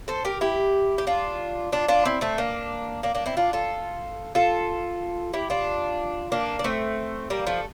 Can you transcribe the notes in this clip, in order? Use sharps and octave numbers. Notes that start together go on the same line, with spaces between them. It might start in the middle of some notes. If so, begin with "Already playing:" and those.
A4 C5
G4 A#4
E4 G4
G4
D4 F4
D4 F4
D4 F4
C4 E4
A3 C4
A#3 D4
A#3 D4
A#3 D4
C4 E4
D4 F4
F4 A4
F4 A4
E4 G4
D4 F4
A#3 D4
D4
A3 C4
G3 A#3
F3 A3